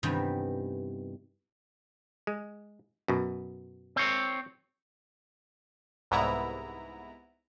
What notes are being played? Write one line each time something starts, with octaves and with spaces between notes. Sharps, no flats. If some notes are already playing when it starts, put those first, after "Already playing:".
G2 C3 D#3 E3 G3 B3
G#3
F#2 B2
C4 C#5
C2 G#2 B3 E4 A#5